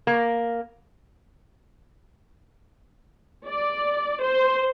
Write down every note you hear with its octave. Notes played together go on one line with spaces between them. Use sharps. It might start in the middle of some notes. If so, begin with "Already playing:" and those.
A#3
D5
C5